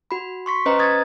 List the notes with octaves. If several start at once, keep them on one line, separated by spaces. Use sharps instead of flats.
F#4 B5
C6 C#6 B6
C#4 B4 C5 D#5 A#5
D#6 G#6 A6